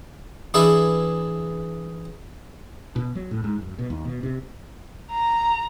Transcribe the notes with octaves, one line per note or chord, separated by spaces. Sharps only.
E3 D4 G#4 B4 D5 E5
B2
F#3
A2
G#2
F#2
B2
D#2
B2
C3
A#5